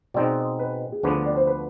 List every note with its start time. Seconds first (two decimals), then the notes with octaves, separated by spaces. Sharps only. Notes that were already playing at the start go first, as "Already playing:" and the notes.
0.14 B2 G#3 C4 D#4 D5
0.59 B4
0.92 G#4
1.03 D2 D3 F3 B3 D4 B4
1.26 D5
1.36 C5
1.47 B4